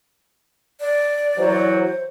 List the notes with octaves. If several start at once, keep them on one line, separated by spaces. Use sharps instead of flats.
D5
E3 F#3 C5